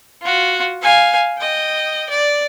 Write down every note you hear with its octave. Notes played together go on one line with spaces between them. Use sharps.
F4 F#4
F5 G#5
D#5 G5
D5